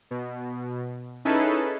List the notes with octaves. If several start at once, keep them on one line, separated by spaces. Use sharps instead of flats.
B2
C#4 D#4 E4 G#4 A4 B4